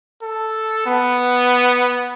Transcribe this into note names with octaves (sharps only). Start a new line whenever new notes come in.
A4
B3